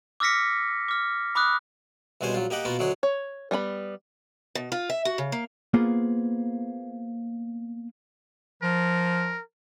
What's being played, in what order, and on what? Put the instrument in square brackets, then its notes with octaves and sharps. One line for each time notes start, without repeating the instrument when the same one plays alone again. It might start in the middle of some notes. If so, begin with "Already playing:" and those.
[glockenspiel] D6 E6 F6 A#6 B6 C#7
D6 F6
B5 D6 D#6 F#6
[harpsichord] C2 B2 G#3 C#4 C5 G#5
A#1 F#3 F4
A#3 G4 D#5 F#5
B2 A#3 B3 F4 F#4
D2 F#3 G#3 G#4 C#5
[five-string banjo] C#5
G3 B3 G#5 B5
[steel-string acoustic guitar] B2
F4
E5
F#4
C#3
A#3
[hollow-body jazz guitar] A#3 B3 F4 G#4 C5
[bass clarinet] F3 [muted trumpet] A#4